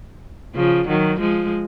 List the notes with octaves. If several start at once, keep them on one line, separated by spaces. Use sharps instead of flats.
C#3 F3
D#3 F#3
F3 G#3